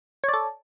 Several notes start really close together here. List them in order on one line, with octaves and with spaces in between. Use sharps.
C#5 D5 A4